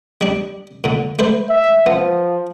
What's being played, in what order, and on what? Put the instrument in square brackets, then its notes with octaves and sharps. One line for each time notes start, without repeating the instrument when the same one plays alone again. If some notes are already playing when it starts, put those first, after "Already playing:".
[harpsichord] G3 D4
A#2 D3
A3 B4 C5
[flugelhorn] E5
[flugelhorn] F3 [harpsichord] B3